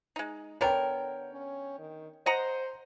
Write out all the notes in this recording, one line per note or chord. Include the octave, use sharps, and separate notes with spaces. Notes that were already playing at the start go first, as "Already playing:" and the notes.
G#3 D#4
D3 B3 A#4 C#5 G5
C#4
D#3
C5 D#5 F#5 A#5